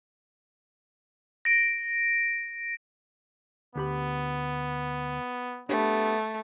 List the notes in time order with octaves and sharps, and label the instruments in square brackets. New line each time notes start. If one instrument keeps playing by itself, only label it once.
[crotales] A#6 D7
[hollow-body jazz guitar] D2 G4 B5 [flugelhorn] B3
[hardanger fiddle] A3 [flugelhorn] B3 [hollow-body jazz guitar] D4 G4 B5